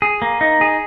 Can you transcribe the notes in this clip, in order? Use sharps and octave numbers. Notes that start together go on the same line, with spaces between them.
G#4
A#3
D#4
G#4